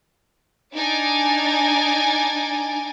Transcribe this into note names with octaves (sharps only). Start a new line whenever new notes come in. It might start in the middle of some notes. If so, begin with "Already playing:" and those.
D4 D#4 G#5 A6 D7